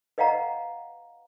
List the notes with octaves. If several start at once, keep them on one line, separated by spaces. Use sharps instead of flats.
B4 D#5 F5 F#5 A#5